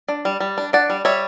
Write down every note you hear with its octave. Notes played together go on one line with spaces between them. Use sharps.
D4
G3
G3
D4
D4 D5 F#5
G3
G3 C#5 E5